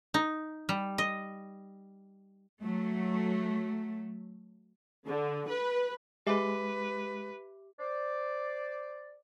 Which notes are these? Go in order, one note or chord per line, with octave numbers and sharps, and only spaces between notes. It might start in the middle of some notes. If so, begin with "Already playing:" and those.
D#4
G3
D#5
F#3 A3
D3
B4
G#3 G4 B4 E5 D6
C5 D5